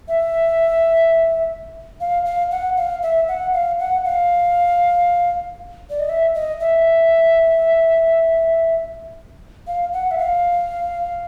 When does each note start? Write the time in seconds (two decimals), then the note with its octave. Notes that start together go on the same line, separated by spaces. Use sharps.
0.08 E5
2.01 F5
2.25 F5
2.51 F#5
2.77 F5
3.02 E5
3.28 F#5
3.54 F5
3.79 F#5
4.05 F5
5.90 D5
6.00 D#5
6.09 E5
6.35 D#5
6.60 E5
9.67 F5
9.93 F#5
10.11 E5
10.19 F5